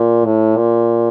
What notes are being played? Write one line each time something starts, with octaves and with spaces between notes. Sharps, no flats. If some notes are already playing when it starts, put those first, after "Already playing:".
Already playing: A#2
A2
A#2